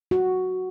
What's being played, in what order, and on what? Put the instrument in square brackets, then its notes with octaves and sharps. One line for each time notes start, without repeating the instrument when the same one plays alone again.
[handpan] F#4